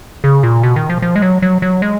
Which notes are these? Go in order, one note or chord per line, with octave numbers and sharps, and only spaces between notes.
C#3
A#2
B2
D#3
F3
F3
G#3
F#3
F#3
F#3
G#3